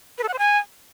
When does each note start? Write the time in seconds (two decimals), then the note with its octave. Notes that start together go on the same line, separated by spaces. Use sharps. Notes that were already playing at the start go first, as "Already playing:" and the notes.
0.18 B4
0.23 A4
0.28 F#5
0.34 C5
0.39 G#5